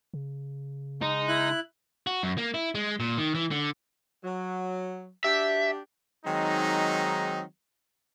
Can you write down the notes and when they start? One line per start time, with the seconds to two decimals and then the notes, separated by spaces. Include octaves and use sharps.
0.14 C#3
1.01 G#3 D#4
1.28 E4 F#6
2.07 F#4
2.23 F#2
2.38 A#3
2.54 E4
2.75 G#3
3.00 A#2
3.18 D#3
3.35 E3
3.51 D3
4.24 F#3
5.24 D4 F#4 G4 E5
6.26 D#3 F#3 G#3 C4 D#4